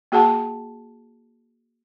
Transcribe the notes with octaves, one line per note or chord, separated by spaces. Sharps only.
A#3 F#4 G#4 F#5 A5